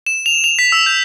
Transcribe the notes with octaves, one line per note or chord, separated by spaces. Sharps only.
E7
F7
F7
B6
E6
G6